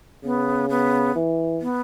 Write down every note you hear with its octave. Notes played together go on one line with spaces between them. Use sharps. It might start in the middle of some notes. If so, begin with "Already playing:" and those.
C#3 B3
B3
E3
B3